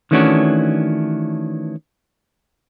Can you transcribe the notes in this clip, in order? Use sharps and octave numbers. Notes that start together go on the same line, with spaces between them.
D#3 E3 A3 C#4 D4 F#4